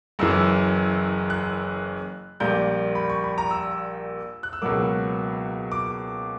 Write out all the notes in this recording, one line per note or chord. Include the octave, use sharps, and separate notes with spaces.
F#1 F#2 E3 E6
F#6
A#1 A#2 G3 A#3 G6
B5
C#6
B5
A#5
E6
F#6
E6
C#2 B2 F#3 A#3 D6
D6